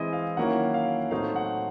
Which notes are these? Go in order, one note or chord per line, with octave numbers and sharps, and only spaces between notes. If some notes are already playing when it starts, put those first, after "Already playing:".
Already playing: E3 G#3 C4 E4 D#5 E5
F5
D#3 F#3 A#3 C#4 E4 F#5
F5
A2 F#3 A3 C4 D#4 F5
F#5